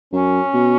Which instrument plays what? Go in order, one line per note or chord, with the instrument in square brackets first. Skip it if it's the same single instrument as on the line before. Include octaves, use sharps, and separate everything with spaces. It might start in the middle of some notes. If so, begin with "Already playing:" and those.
[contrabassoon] F#2 [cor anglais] C#4
[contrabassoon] B2